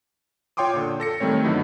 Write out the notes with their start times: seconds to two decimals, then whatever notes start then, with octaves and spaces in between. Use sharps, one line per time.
0.57 F4 C#5 G5 C6 D6 D#6
0.74 A#2 D3
1.00 A4 A#6 C#7
1.20 D#3 G3 A3 C4 C#5
1.44 G2 D3 F#3 B3 D#4 E4